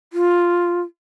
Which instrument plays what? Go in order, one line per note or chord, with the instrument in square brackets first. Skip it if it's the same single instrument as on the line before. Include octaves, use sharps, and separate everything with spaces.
[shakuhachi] F4